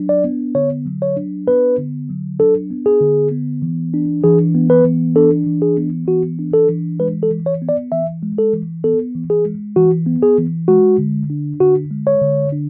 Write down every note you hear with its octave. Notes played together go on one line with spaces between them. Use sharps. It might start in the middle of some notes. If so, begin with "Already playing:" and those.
Already playing: F#3 D4
D5
B3
D3 C#5
F#3
C#5
D4
B3 B4
D3
F#3
D4 A4
B3
G#4
D3
B3
E3
D4
E3 G#4
B3
B4
E3
D4 A4
E3
G#4
B3
E3 F#4
D4
A4
E3
G#3 B4
A4
E3
C#5
B3
D5
E3 E5
G#3
A4
E3
B3 A4
E3
G#4
G#3
E3 F#4
B3
G#4
E3
G#3 F#4
D3
D4
D3 F#4
G#3
C#5
D3
D4